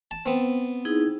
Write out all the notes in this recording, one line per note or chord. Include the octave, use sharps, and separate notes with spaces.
A5
B3 C4
D#4 E4 G#4